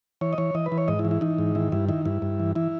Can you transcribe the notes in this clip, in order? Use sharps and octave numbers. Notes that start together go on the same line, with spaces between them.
E3 C#5
D#5
E3 C#5
E3 D#5
B4
E3
C#5
G#2 D#5
E4
E3
E4
E3 D#4
G#2
D#3 E4
G2 E4
D#3 E4
G2 E4
G2
E3
E3 E4